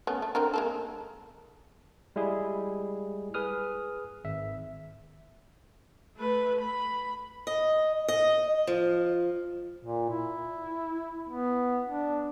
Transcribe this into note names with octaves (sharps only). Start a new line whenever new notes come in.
A3 B3 C#4
A3
D3 C4 A#4
G#3 A#3 A4
G3 G#3 E4 G#4
G#4 B4 D#6 F6
G#1 E5
A3 B4
B5
D#5
D#5
F3
A#2
E4
B3
D4